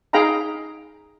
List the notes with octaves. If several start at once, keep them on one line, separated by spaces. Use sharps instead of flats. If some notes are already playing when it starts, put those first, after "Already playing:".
D#4 G#4 F5 G5 A#5 B5